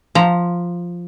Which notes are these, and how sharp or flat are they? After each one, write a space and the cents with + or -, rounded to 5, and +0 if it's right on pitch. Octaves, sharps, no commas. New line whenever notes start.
F3 +0 A#5 -10